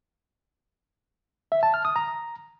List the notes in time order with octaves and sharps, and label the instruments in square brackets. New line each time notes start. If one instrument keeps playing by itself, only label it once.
[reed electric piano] E5
A5
F6
D#6
A#5